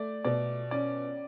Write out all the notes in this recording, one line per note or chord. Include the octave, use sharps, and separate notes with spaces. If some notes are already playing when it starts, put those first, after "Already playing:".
Already playing: A3 D5
B2 D5
C#4 D5